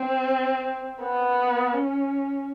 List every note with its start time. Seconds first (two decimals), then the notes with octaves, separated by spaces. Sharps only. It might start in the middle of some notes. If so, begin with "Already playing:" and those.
Already playing: C4
1.02 B3
1.74 C#4